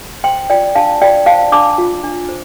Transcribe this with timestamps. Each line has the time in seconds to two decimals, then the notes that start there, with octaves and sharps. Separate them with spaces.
0.24 C5 G5 C6
0.50 F4 D5 G5
0.75 D4 F5 A5
1.01 F4 D5 G5
1.26 C5 F5 A5
1.52 D4 A5 D6
1.78 F4
2.04 D4
2.29 C5